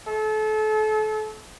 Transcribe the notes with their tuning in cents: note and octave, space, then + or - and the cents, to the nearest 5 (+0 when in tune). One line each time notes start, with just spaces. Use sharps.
A4 -35